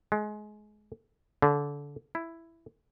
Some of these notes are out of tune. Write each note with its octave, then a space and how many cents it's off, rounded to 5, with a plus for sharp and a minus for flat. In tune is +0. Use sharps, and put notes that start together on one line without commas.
G#3 +25
D3 -25
E4 +5